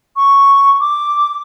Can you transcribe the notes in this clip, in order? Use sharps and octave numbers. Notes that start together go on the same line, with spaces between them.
C#6
D6